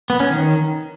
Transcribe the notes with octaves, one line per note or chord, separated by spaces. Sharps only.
B3
C#4
D#3